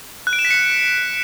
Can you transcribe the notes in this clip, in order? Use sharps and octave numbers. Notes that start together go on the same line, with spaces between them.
F#6
D7
E7
B6
C#7